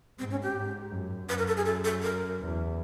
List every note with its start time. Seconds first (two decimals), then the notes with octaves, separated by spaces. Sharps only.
0.19 G#2 C4
0.31 C#4
0.43 G4
0.56 G#2
0.92 F#2
1.29 F#2 B4
1.38 A#4
1.48 A4
1.57 G#4
1.66 A4
1.84 A4
2.03 A#4
2.40 E2